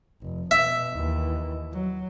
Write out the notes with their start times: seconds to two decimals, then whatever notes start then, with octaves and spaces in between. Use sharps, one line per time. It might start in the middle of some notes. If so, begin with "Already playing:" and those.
0.22 F1
0.51 B2 E5
0.94 D#2 E3
1.72 F#3